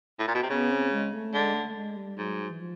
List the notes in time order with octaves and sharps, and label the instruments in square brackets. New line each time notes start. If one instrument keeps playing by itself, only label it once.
[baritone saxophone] A2
A#2
B2
C3
[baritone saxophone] C#3 [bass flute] B3
[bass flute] C4
G#3
A3
[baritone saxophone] D3 [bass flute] G#3
[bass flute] A3
G#3
G3
[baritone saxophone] G#2 [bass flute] F#3
[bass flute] E3
F3